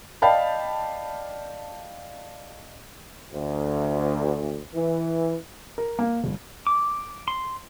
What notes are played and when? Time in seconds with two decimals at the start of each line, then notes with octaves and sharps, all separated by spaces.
0.22 D5 D#5 F5 G5 A5 B5
3.33 D2
4.74 E3
5.78 A#4
5.99 A#3
6.24 G1
6.67 D6
7.28 C6